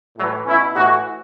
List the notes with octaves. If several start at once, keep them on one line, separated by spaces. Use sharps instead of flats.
A2 E3 F#3
B2 C#4 E4
A2 E3 D#4 F#4